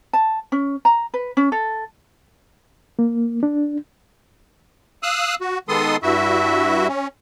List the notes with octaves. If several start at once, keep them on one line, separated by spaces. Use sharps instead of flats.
A5
C#4
A#5
B4
C#4
A4
A#3
D4
F5 D#6 E6 F#6
F#4
D#3 G#3 B3 A4 C6 D#6
G2 E4 F#4 E5
C#4